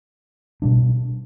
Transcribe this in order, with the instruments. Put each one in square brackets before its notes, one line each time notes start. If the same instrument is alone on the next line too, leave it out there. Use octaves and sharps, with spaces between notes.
[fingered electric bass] B2 G3 D4